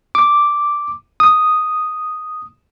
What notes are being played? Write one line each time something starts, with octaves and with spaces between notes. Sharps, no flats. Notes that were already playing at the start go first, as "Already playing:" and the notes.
D6
D#6